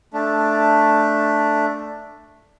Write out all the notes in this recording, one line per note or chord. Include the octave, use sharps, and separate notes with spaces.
A3 D4